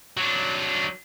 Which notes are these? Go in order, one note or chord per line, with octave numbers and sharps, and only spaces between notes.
F#3 D4